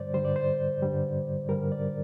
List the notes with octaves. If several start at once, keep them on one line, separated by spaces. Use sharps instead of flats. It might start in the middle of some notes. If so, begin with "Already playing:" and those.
Already playing: G2 D3 G3 C5 D5
G2 D3 G3 C5
D5
C5
G2 D3 G3
G2 D3 G3 A#4
D5